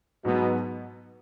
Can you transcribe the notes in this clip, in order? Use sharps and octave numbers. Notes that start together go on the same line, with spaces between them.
G#2 B2 F#3 B3